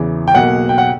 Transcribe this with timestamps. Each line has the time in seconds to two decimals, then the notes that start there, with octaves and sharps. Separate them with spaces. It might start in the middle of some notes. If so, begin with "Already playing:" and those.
Already playing: E2 C#3 E3
0.28 G5
0.34 B1 B2 A#3 F#5
0.69 G5
0.78 F#5